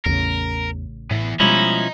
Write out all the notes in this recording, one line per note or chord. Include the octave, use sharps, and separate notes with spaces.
A1 E2 C#3 A#4
A2 E3 B3
B2 F3 G3 G#3 C#4 E4 D#5 A#5